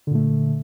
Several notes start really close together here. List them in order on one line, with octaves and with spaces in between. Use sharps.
D3 A#2 A3